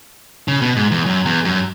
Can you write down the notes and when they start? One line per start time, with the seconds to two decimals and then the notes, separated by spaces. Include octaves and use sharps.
0.48 C#3
0.62 B2
0.76 G#2
0.91 E2
1.06 F#2
1.25 E2
1.45 F#2